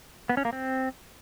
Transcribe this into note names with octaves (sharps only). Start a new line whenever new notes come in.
B3
C#4
A#3
C4